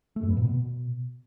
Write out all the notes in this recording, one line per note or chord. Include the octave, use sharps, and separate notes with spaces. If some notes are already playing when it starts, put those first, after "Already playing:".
A3
F#2
B3
A#2
B2